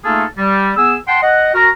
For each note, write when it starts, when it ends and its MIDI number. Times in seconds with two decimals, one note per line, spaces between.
0.04 0.24 57
0.04 0.24 58
0.04 0.24 63
0.04 0.24 65
0.04 0.24 68
0.04 0.24 69
0.37 0.71 55
0.76 0.96 59
0.76 0.96 68
0.76 0.96 80
0.76 0.96 88
1.07 1.20 78
1.07 1.20 79
1.07 1.20 81
1.07 1.20 84
1.22 1.54 75
1.22 1.54 78
1.54 1.70 66
1.54 1.70 70
1.54 1.70 82